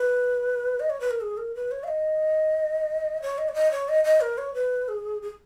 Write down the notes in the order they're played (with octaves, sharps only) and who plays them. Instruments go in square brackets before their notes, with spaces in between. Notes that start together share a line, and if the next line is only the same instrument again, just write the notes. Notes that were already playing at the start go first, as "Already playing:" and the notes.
Already playing: [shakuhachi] B4
D#5
C#5
B4
A#4
G#4
A#4
B4
C#5
F5
D#5
C#5
D#5
C#5
D#5
C#5
D#5
D#5
A#4
C#5
B4
G#4
G#4